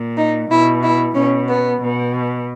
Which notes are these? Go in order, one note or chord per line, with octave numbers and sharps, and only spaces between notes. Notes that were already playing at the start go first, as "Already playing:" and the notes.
Already playing: A#2
D#4
B2 E4
E4
B2 C#4
B3
B2